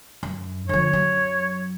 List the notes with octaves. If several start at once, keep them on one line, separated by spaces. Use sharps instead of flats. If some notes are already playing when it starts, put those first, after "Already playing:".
F#2
D3 F3 C#5
F#2 F#3